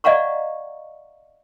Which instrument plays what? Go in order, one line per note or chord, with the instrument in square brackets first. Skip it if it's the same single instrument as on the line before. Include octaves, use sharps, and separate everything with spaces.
[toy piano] D5 D#5 F5 F#5 A#5 C#6